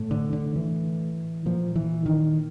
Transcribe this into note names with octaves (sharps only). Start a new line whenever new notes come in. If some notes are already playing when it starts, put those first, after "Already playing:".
Already playing: A2
D3
D3
E3
A#2 F3
E3
D#3